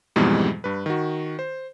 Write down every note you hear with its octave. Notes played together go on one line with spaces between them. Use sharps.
F2 G#2 B2 E3 G3 G#3
G2 B4
D#3 F#4
C5